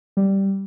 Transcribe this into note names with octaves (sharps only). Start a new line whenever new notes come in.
G3